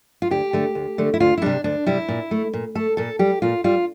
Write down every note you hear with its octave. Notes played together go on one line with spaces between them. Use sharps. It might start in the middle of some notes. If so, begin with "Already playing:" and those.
F4
D2 G4
D3 A3
D2
D3 A3
E4
D2 F4
E4
C3 G3 D4
D2 D4
C3 G3 E4
A#2
A3
A#2
A3 A4
A#2 A4
G3 G4
A#2 F4
G3 F4